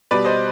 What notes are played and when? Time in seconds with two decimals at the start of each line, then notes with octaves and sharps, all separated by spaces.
0.11 B2 G3 B4 D5
0.25 C5 D#5